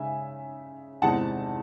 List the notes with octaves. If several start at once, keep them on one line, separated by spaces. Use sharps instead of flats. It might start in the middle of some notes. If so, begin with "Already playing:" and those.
Already playing: C#3 G#3 D#4 E5 G#5
E2 C3 D#3 G#3 D#4 F#5 A5